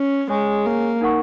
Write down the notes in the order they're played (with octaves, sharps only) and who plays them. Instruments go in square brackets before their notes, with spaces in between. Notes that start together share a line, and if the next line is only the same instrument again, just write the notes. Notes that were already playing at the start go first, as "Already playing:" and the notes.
Already playing: [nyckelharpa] C#4
[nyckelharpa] G#3 [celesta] G#4 C#5 G#5 C#6
[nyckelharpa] A#3
[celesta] D#4 A#4 F#5 C#6